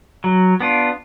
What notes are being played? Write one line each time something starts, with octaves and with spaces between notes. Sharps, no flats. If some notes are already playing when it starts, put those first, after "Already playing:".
F#3
B3 D4 F4